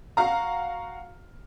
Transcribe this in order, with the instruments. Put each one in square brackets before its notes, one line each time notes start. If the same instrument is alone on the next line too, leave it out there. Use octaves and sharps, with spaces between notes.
[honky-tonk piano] F#4 F5 A#5